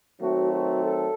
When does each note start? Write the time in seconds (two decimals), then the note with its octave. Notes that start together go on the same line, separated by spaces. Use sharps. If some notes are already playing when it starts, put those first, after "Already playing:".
0.20 D#3 F#3 A3 C4 F#4
0.53 F#4
0.84 A4